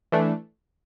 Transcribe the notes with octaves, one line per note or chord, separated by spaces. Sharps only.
E3 A3 D4